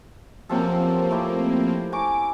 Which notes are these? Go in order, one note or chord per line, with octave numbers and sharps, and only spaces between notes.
F#2 C3 F3 A#3 C4 A4
A3 E4 G4
G#5 A#5 C#6 D6